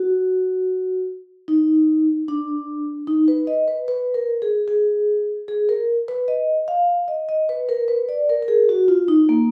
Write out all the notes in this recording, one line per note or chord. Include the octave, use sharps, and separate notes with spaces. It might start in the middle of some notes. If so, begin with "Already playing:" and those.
Already playing: F#4
D#4
D4
D#4
B4
D#5
B4
B4
A#4
G#4
G#4
G#4
A#4
B4
D#5
F5
D#5
D#5
B4
A#4
B4
D5
A#4
A#4
G#4
F#4
F4
D#4
A#3